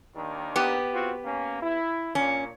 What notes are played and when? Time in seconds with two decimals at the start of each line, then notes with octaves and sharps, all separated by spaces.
0.15 D#2 D#3 D4
0.56 B3 G4
0.92 C4 F4 F#4
1.24 A#3 C#4
1.61 E4
2.15 A#2 C#4